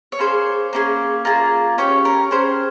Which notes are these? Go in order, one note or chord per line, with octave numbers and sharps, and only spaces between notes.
C#5
A#3 C#4 G#4 C5
A#3 C#4 G#4
A#3 F4 G#4
C#4 G4 C#5
A#4
C#4 G#4 C5